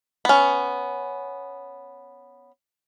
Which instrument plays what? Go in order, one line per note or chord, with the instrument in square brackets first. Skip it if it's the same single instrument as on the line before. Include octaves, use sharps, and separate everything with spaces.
[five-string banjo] B3 C#4